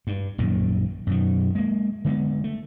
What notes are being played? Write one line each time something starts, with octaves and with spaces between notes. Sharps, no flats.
G2
A#1 F#2 A#2 D#3
F#2 B2 D#3
G#3 A#3
D3 G#3 B3
A3